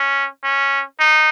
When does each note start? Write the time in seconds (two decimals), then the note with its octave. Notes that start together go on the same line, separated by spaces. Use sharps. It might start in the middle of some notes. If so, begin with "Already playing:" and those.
Already playing: C#4
0.44 C#4
1.00 D#4